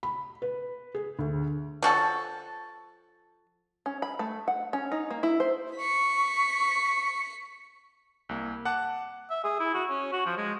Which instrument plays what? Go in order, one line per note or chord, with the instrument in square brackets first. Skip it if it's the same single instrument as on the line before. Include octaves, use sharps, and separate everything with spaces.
[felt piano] B5
B4
G#4
D2
[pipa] F3 F#4 A4
[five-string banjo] C#4
B5
A3
F#5
C#4
D#4
A#3
E4
C5
[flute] C#6 [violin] B6 C#7
[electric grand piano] C2 A#3
F#5 A5 D6 F#6
[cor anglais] E5
G#4
E4
F#4
C#4
F#4
F3
G#3